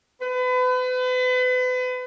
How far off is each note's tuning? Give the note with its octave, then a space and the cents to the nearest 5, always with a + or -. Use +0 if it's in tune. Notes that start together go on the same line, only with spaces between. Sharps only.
B4 +35